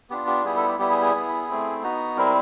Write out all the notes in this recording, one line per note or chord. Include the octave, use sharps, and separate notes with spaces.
B3 D4 F4 G4
G4
G3 B3 E4 G#4
A4
G4
G3 B3 E4 G4
G#4
G#4
B3 E4
A3 C4 E4
B3 D#4 F#4
G3 C4 E4 A#4